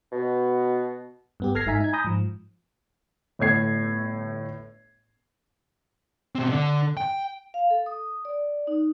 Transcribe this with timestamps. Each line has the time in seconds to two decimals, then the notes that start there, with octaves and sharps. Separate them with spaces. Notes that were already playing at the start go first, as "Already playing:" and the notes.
0.13 B2
1.40 G2 B3 G4
1.55 G1 A4 F6 G#6 A#6 C7
1.66 G#2 D#4 E5 G#5 A#5 B6
1.80 D#4 G#6
1.93 G#5 A#5 B5 D#6 G6 A#6
2.05 G#2 F3
3.39 G1 A2 A3 G#6 C7
6.35 B2 C4
6.50 D3 D4
6.97 G5
7.54 F5
7.70 A4
7.86 D#6
8.25 D5
8.67 D#4